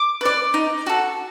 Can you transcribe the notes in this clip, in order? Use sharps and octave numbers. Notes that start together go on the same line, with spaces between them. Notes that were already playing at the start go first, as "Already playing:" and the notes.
Already playing: D6
B4 D5
D#4
F#4 A4